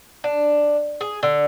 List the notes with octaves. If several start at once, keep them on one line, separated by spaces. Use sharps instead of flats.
D4
G#4
D3